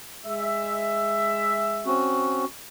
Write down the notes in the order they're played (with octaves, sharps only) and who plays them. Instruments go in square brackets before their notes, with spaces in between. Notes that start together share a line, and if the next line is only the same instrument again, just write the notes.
[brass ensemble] G#3 E5
[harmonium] C4 C#4 F#4